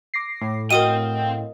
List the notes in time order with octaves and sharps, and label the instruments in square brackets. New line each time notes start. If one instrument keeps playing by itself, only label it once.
[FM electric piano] D6 A#6 C7
[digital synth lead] A2
[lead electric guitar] C4 G5 [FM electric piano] F#4 D#5 F5 [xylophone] A#4 D#6 D#7